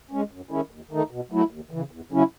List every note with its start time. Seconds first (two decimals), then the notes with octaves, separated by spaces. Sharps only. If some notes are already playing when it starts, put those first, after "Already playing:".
0.11 G#3 C#4
0.31 F#2
0.50 D#3 G#3 C#4 E4
0.70 D#2
0.91 D#3 A3 D#4
1.11 B2
1.31 F#3 A3 E4
1.50 D#2
1.71 C#3 E3
1.91 E2
2.12 C#3 F#3 C#4 E4